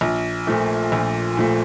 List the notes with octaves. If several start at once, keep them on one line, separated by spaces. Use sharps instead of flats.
A#1
A#2 F3 A3
A#1
A#2 F3 A3